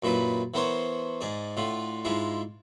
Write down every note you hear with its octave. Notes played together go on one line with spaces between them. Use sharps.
F#2 A#2 E4 B4 B5
E3 B3 A#4 C5 C#5
G#2 G#4 D5
A2 D3 F4
G#2 G#3 E4 F4